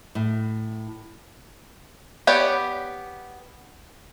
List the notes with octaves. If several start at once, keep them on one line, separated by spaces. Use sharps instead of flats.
A2
B3 G4 C#5 D5 F#5